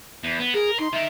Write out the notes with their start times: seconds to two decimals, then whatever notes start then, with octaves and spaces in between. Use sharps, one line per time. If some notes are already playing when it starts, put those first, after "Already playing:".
0.24 E2
0.40 B3
0.54 G#4 A#4
0.79 D#4 C6
0.93 D#3 A#4 E5